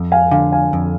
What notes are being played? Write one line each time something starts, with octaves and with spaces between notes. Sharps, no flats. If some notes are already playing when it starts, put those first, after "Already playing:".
Already playing: F2
F5 G#5
D3 F5 G#5
F5 G#5
F2